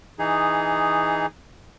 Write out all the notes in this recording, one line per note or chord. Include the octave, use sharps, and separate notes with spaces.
E3 D#4 G#4